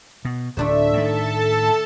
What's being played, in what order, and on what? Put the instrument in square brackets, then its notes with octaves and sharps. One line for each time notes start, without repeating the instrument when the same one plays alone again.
[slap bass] B2
[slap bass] D1 [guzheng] A3 D4 C5 [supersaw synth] E5
[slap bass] A2 D#3 [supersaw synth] A4 A5